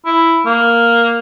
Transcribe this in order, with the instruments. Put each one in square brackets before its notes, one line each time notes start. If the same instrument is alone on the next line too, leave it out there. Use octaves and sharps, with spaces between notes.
[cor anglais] E4
A#3